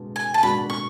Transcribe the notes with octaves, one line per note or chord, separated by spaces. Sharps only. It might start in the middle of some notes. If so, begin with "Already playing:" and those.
Already playing: B2 G#3 D4
G#5
A5
B2 G#3 D4 F#4 B5
C#6